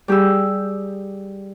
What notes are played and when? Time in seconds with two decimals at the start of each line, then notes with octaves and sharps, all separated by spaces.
0.08 G3 G4 G#4 E6